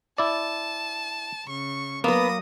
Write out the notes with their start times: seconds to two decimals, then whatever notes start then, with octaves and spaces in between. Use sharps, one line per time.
0.18 E4 D5 A5
1.47 C#3 C#6
2.04 F#3 A#3 B3 B4 D#6 A#6